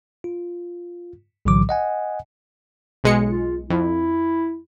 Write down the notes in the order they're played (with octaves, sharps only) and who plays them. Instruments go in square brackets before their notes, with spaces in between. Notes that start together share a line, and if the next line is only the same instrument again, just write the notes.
[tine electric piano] F4
B1 A2 D3 E3 F#3 D6
D#5 F#5 G#5
[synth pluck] B1 G#3 C#7
[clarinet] F4
[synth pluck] F2 [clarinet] E4